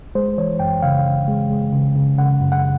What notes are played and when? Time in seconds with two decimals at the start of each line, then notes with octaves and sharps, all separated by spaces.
0.15 G#3 C5
0.38 E3 C#5
0.60 F#2 G5
0.82 C#3 F5
1.05 C#3
1.28 G#3
1.50 G#3
1.73 C#3
1.96 C#3
2.18 C#3 F#5
2.40 F#2
2.52 F#5